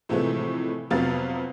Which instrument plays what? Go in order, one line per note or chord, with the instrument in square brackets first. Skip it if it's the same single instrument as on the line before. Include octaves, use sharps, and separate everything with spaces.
[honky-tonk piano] A2 C3 E3 F3 G#3 A3
F2 C3 F#3 B3 F5 A6